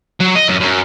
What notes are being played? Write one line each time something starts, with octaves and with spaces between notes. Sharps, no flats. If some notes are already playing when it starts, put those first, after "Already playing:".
F#3
D#5
F#2
F#2